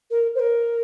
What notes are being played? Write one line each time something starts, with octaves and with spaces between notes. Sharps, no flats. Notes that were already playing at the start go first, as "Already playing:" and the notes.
A#4
C5
A#4